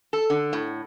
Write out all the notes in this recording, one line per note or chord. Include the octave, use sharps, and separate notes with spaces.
A4
D3
A2